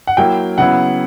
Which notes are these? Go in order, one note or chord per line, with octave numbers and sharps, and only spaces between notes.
F#5
F#3 A#3 E4 G5
C#3 F#3 B3 E4 F#5